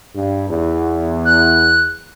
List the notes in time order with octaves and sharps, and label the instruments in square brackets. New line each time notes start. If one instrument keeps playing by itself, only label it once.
[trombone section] G2
E2
[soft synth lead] F#6